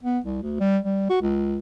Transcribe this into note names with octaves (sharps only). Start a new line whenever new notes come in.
B3
C2
D2
G3
G3
F#4
C#2